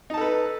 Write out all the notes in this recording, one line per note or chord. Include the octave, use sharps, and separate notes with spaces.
D#4 A4 B4 A5